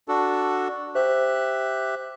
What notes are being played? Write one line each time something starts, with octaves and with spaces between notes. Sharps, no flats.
D4 F#4 A4
G4 C5 E5 F#6